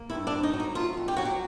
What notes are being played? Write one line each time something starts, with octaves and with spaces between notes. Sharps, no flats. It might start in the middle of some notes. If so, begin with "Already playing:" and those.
Already playing: A#3
G2 E4
D4
G2
D#4
F#3
D#4
A3 F4
F2
G4
F#3 F#4
G4